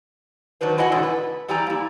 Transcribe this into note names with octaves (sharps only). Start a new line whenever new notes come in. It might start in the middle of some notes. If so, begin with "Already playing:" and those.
D#3 F#3 D4 B4 C5
E2 E4 F#4 D#5 F#5 G#5
G#2 B2 D3 E3 C#4 D4
B4
E2 G3 E4 G4 G#5 A#5
A#3 E4